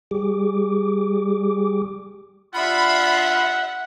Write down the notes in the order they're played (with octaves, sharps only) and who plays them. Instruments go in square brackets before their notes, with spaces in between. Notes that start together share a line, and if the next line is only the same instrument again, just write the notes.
[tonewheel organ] G3 G4 G#4 D6
[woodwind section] G3 D4 F4 [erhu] E5 [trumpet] F#5 [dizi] B5